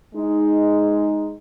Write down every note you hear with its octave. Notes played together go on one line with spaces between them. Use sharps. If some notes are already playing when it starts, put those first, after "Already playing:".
G#3 D#4